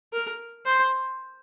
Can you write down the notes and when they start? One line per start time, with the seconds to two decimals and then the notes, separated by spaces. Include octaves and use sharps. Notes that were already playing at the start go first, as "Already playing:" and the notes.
0.13 A#4
0.65 C5